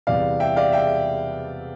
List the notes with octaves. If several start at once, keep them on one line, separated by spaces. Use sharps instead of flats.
E2 C3 G3 D5 F5
E5 G5
D5 F5
E5 G5